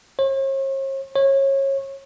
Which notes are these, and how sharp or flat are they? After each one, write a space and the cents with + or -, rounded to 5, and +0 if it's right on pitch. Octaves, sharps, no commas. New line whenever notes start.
C#5 -45
C#5 -25